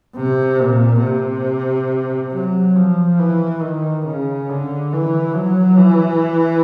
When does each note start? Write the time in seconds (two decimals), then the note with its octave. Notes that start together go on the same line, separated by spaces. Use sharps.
0.16 C3
0.60 A#2
1.03 C3
2.33 F#3
2.76 F3
3.19 E3
3.62 D#3
4.05 C#3
4.49 D3
4.93 E3
5.35 F#3
5.78 E3